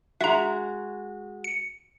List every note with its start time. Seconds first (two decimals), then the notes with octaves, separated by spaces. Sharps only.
0.21 G#3 F#4 E5 A#5
1.44 C#7